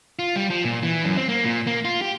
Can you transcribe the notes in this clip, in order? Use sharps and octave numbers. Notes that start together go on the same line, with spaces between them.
F4
G3
F3
A#2
E3
F#2
C4
A#3
A#2
A#3
F4
G4